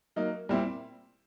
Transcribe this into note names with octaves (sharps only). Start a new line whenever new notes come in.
F#3 A#3 D#4
A#2 G3 C4 E4